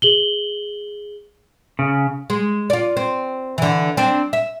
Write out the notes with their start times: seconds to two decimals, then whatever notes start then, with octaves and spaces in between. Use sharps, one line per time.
0.02 G#4 F#7 G7
1.79 C#3
2.30 G#3
2.70 F4 D5
2.97 C4
3.58 D3 E3
3.97 C4 D4
4.33 E5